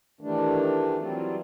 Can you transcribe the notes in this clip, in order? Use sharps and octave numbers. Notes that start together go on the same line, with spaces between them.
D#3 E3 G3 A3 D4
E3 F#3 G3 C4 F4